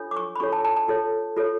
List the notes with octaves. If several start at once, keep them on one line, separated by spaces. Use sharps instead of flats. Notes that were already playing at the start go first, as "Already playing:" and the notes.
Already playing: D4 F4 A4 C#5
D6
C#6
B5
D4 F4 A4 C#5 C#6
A5
A5
A5
F4 A4 C#5
F4 A4 C#5